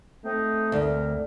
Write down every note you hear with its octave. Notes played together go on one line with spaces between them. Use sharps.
A3 C4 D#4
D2 C4 A#4